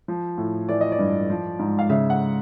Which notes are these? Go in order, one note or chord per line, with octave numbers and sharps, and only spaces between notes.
F3
A2
E3 D5
D#5
D5
G2
F3
G#2
F5
C#3 E5
F#5